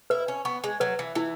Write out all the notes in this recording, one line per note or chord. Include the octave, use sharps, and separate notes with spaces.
E4 B4
C#4
B3 C#6
G#3
F#3 B4
E3
E3 E4